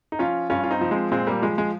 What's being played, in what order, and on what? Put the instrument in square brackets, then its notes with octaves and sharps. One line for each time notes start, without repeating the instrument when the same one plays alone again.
[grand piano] D#4
F3 C#4 F4
G2 C#4 F4
F4
C4 D#4
F3
G#3 C4
A#2 G#3 C4
G3 A#3
F3 G#3
G#3